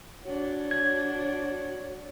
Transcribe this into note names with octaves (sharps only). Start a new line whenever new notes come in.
D4 F#4 C#5
G#6